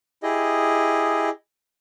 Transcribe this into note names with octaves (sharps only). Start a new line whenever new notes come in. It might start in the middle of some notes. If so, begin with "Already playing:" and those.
E4 G4 G#4 D#5